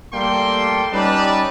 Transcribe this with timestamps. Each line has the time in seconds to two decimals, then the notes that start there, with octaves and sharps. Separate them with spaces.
0.13 A2 G3 A#3 A4 G5 C6
0.92 G3 C#4 D#4 B4 D5 A5